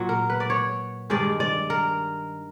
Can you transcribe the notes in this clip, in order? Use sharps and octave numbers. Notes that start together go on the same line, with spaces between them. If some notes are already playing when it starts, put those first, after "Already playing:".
Already playing: A#2 F#3
A#4
B4
D5
C#5
G2 D#3 G#3 D5
D5
A#4